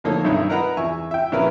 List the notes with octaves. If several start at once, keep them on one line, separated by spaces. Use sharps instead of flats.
D2 F3 A#3 D#4 A4 C#5
B1 G2 D#3 D#4 C#5 E5
A#4 B4 D#5 F#5 A#5 B5
E2 E5 G#5 C#6
E5 G5
A#1 C#4 E4 A#4 B4